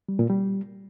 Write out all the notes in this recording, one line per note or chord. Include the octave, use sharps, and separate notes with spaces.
G3
A#2
G3